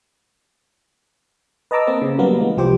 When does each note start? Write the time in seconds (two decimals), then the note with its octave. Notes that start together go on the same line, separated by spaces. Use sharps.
1.71 B4 D#5 A5 A#5 D6 E6
1.87 A#3 C4
2.02 C#3
2.18 F#3 G3 A#3 B3 A#4
2.40 E3 G#3 B3
2.57 C2 F3 G4 C5 G5 D6